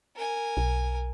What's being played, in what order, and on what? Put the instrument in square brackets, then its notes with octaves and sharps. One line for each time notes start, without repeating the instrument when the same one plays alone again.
[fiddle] A#4 G#5
[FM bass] B1